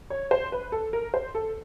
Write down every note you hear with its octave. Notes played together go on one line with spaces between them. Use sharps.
C#5
C5
B4
A4
A#4
C5
A4